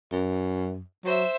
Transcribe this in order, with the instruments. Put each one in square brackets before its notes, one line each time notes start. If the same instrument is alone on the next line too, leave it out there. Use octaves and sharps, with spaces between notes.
[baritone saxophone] F#2
[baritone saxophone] F#3 [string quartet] C5 E5